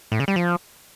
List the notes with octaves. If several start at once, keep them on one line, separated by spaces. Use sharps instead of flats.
A2
C#3
G3
F3